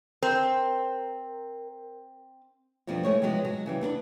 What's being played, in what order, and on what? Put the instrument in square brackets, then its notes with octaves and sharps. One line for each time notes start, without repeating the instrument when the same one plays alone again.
[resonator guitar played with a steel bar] C4 [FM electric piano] A#4
[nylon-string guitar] F2 B2 F3 G3 C4 D4
E2 G#3 A3 C#5
C3 F3 F#3 G#3 B3
F#3 G#3
C#3 E3 G3
B3 D4 A#4 B4